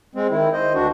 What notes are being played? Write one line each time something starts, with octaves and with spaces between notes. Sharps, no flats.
G#3 C4
D#3 E4
C5 D#5
D2 D4 F#4